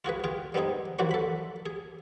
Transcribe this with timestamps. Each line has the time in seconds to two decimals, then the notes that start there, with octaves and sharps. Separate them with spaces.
0.05 F4 F#4 G#4 B4
0.24 F4 G#4 G5
0.54 G3 B3 C4 D#4 G#4
0.99 A#2 E3 F#3 F#4 C5 C6
1.11 A4 B5
1.66 G#4